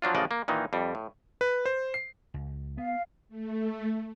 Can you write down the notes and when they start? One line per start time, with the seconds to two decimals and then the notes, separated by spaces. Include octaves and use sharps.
0.02 F3 F#3 D4 F4
0.15 A1 C#3 F3 F#4 D5 D#5
0.31 A#3
0.48 A#2 D#3 E3 D#4
0.73 F2 G3
0.95 A2
1.41 B4
1.65 C5
1.94 C7
2.34 C#2
2.77 B3 F5
3.29 A3